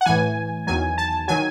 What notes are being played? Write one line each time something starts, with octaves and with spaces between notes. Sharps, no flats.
F#5
A2 E3 G#5
E2 D#3 F#3 G#5
A5
D#3 F#3 G#5